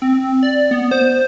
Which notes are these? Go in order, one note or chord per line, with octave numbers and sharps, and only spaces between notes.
C4
D5
B3
C5